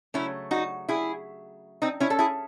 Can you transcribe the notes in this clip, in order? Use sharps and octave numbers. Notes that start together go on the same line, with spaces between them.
C#3 F#3 A3 C#4 E4
D#4 F#4
E4 G#4
C4 D#4
C#4 E4
A4
E4 G#4